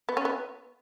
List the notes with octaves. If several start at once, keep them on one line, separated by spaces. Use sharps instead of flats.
B3
C#4
B3